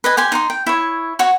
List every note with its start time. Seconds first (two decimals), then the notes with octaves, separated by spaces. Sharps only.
0.04 B4 D#5 G#5
0.17 G4 G#5 C6
0.32 D#4 F#5 C6
0.50 G5
0.66 E4 C#5
1.19 F#4 C#5 C#6